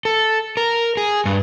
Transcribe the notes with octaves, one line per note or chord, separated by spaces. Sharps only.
A4
A#4
G#4
G2